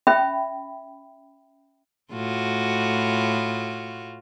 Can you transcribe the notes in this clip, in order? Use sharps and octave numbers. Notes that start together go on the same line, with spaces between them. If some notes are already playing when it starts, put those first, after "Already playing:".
C#4 E5 G5 B5
A2 F4 F#4